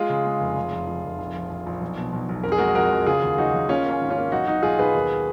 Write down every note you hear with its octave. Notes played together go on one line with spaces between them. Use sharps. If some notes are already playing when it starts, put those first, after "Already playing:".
Already playing: G#3 F4 G#4
C#3
G#3
F1
F1
F2
F3
F1
A#1
A#1
A#1
A#1
B1
B2
B1
B1
F2 A#4
G#4
G#3 F#4 A#4
F2 F#4 A#4
F2
C#3 F4 G#4
D#2
F#3 D#4 F#4
F#3
A#3 C#4 F4
A#3
C#4
G#1
C#4 F4
A#3
B1 D#4 F#4
B1 D#4 F#4
B1 F4 G#4
B1 G#4 B4
D#2